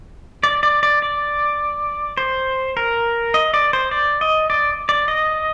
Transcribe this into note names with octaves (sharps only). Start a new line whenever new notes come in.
D5
D5
D5
D5
C5
A#4
D#5
D5
C5
D5
D#5
D5
D5
D#5